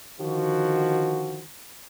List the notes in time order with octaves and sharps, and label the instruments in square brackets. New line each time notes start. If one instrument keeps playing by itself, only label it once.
[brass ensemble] D3 D#3 F3 F#4